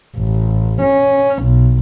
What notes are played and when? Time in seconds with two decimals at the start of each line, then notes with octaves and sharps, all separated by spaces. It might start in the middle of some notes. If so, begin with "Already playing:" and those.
0.17 A1
0.81 C#4
1.42 B1